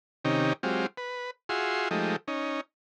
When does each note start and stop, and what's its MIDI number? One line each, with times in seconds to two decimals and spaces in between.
0.25 0.53 48
0.25 0.53 51
0.25 0.53 61
0.25 0.53 63
0.25 0.53 67
0.63 0.86 54
0.63 0.86 56
0.63 0.86 60
0.63 0.86 65
0.63 0.86 67
0.97 1.31 71
1.49 1.89 65
1.49 1.89 66
1.49 1.89 68
1.49 1.89 76
1.49 1.89 84
1.91 2.16 53
1.91 2.16 56
1.91 2.16 57
1.91 2.16 63
1.91 2.16 67
2.28 2.61 61
2.28 2.61 63